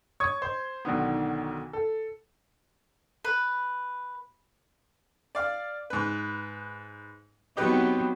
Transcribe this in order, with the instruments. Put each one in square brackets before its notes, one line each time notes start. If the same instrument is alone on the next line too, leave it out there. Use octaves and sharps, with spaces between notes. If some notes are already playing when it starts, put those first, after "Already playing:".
[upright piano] C#5 C#6 D#6 G#6
C5 C6
B1 D3 D#3 B3
A4
[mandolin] B4
[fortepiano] D5 F5
G#2 B4
[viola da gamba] F#3 B3 C4 [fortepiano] D#4 G4 B4